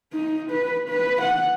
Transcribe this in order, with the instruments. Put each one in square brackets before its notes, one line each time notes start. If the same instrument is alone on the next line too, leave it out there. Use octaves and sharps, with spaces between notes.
[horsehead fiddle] D#4
B4
B4
F#5